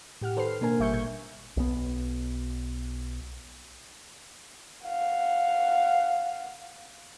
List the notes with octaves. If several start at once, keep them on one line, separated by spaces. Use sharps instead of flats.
A2 G4 F#5 F6
D#3 A4 B4 C5 F6 C7
B2 A#3 D4 A#4 G#5
G#1 G3 E5 C#6 G6 C#7
A#2 G6 G#6
B1 B3
F5 F#5